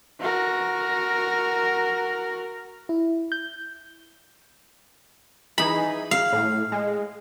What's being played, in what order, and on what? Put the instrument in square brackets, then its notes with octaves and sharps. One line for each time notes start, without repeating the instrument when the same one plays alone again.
[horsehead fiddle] F#4 A#4
[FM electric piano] E4
G6
[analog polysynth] E3 D#4 G#4 [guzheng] B5
[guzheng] F5
[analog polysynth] A2
G#3